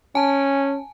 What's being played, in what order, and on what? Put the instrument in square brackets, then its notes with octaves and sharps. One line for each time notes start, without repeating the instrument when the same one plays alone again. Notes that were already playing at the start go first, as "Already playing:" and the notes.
[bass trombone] C#4 [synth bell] G#5 A5